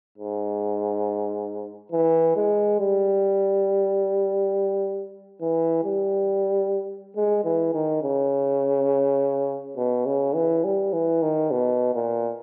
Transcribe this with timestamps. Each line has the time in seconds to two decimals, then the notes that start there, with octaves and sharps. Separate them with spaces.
0.18 G#2
1.92 E3
2.36 G#3
2.80 G3
5.42 E3
5.85 G3
7.16 G#3
7.45 E3
7.74 D#3
8.03 C#3
9.77 B2
10.06 C#3
10.35 E3
10.64 G3
10.93 E3
11.22 D#3
11.51 B2
11.95 A#2